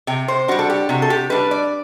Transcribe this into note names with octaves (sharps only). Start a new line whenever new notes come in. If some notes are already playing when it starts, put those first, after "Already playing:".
C3 G5
C5
G3 D4 F#4
A4
G4
C3 F#4
A4
G4
G3 D4 B4
D5